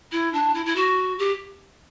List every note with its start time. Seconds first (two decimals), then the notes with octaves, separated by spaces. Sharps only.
0.11 E4
0.32 D4
0.54 E4
0.65 E4
0.75 F#4
1.18 G4